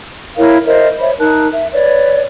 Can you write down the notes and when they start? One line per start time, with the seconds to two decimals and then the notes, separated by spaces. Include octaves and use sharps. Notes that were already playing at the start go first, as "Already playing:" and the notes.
0.37 E4 A#4 C#5 F5
0.66 A#4 C5 D#5 E5
1.00 C5 C#5 E5 B5
1.19 D#4 A#4 A5 F#6
1.51 E5
1.73 B4 C#5 D5